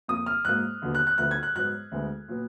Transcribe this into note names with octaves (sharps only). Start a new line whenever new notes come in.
F2 F3 A#3 D#6
F6
G#2 F#3 A#3 F#6
D#2 D3 F#3 B3
F#6
F#6
D2 D3 F3 B3 F#6
G#6
F#6
G#2 F#3 B3 F#6
D2 D3 G#3 B3
A#2 F#3 B3